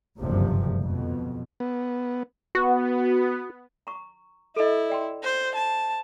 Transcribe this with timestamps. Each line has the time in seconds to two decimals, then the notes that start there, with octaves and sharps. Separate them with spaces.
0.19 F#1 D2 G2 C3 F3
0.80 F2 B2
1.60 B3
2.55 B3 F#4
3.87 A#5 C#6
4.56 E4 A4 D#5
4.89 D5 G5 C6
5.23 C5
5.55 A5